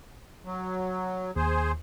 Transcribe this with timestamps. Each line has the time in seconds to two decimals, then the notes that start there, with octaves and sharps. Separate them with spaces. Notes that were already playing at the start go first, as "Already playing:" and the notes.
0.45 F#3
1.36 D#2 G#4 C5